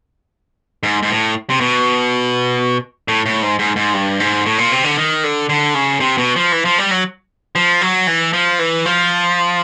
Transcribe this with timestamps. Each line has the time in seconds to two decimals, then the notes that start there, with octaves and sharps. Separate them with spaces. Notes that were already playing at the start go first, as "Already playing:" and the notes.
0.83 G#2
1.03 G#2
1.10 A2
1.50 C3
1.61 B2
3.08 A2
3.26 A2
3.42 G#2
3.59 G#2
3.76 G#2
3.94 G2
4.20 G#2
4.46 A2
4.58 A#2
4.72 C3
4.84 D3
4.97 D#3
5.24 D3
5.49 D3
5.74 C#3
6.00 C3
6.18 B2
6.36 F3
6.52 E3
6.65 F3
6.78 G3
6.91 F#3
7.55 F3
7.81 F#3
8.07 E3
8.33 F3
8.59 E3
8.86 F3